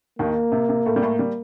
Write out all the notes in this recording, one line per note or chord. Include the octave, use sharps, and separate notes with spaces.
D#2 D#3 A#3
C3
C3
A2 A3
G3
A2 A3
G3